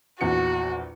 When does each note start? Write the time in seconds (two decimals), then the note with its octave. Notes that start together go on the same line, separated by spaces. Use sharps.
0.21 A#1 E2 F#4 C#7